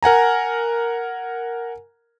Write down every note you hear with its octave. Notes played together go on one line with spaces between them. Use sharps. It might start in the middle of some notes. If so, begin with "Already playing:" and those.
A#4 F#5 G#5 A#5